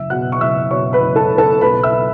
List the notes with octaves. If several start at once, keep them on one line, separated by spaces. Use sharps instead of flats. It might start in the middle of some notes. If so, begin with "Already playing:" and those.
Already playing: F#1 E5 E6
B2 F#5 F#6
C#6
F#1 E5 E6
B2 C#5 C#6
B4 B5
F#1
A4 A5
F#1
A4 A5
B1 B4 B5
E5 E6